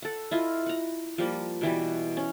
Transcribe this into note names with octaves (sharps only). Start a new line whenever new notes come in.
A4 F#5
E4 F4 D#5
F#5 A#5
F3 G3 A#3
B2 E3 G3
C#4